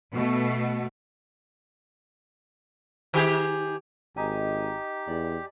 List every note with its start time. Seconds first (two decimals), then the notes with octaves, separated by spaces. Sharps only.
0.13 B2 A3
3.14 D#3 G4 G#4
4.17 G#1 D#4 G4 G#5
5.08 E2 D5